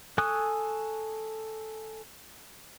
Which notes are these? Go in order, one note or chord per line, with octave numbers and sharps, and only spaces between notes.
A4 G#5 C#6 D#6 F#6